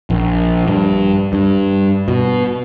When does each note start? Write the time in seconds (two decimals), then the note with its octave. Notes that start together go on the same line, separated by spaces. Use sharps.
0.10 A#1
0.67 G2
1.33 G2
2.08 B2